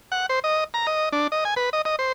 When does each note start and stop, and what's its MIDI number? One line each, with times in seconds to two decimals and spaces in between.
0.12 0.26 78
0.29 0.39 72
0.44 0.64 75
0.74 0.87 82
0.87 1.09 75
1.12 1.27 62
1.32 1.44 75
1.45 1.54 80
1.56 1.70 71
1.73 1.82 75
1.85 1.96 75
1.99 2.12 72